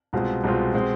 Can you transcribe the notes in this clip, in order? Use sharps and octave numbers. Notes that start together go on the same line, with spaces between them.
C2 B2 G#3 C4 F4
C2 B2 G#3 C4 F4
B2 G#3 C4